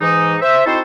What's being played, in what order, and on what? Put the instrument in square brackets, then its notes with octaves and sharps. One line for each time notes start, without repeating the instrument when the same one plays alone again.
[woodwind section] G#2 E3 D#4
C5 E5
C4 D#4 E4 F#4 A4 C5